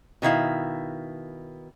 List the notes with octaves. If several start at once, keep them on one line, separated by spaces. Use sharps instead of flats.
B2 D#3 E4 F5